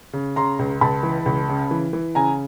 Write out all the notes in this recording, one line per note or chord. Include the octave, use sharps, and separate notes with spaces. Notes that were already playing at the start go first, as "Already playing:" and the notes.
C#3
C#3 A#5 C6
C#2
C#2 A5 B5
E3
C#2
C#3
E3
E3
C#3 G#5 A#5